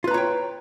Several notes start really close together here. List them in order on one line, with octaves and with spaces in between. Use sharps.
F4 B4 A#5 C#5 G5